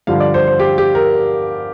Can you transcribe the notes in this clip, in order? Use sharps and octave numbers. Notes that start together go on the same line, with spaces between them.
G2 D3 F3 F5
D5
C5
C5
G4
G4
A#4